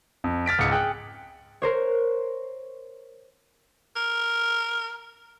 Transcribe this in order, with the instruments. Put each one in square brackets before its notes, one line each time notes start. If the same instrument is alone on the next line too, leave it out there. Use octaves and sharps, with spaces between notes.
[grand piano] F2
F6 A6 B6 D7
C#2 G#2 G#4 C#7
G#4 G5 F#6
[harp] A#4 C5 C#5
[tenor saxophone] A#4